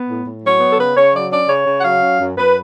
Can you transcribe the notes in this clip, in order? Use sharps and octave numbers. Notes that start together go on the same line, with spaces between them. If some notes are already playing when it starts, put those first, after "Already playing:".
Already playing: B3
A2
A2
F#3 C#5
B3
A4
C#3 B4
C#3 C#5
F#3 D5
C#4 D5
C#3 C#5
C#3
F#5
F#3 F5
C#4
F#2
F#2 B4